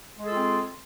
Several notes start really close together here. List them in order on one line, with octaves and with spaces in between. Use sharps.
G#3 G#4 A4 F4 C4